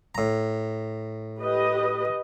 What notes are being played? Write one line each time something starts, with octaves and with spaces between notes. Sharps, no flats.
A2 A#5
G4 B4 D#5